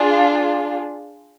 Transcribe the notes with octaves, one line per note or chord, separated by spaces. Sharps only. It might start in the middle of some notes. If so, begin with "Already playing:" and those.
Already playing: D4 F4 G#4